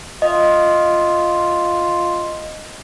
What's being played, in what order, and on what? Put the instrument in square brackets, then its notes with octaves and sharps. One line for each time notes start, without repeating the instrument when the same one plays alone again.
[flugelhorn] F4 [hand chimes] D#5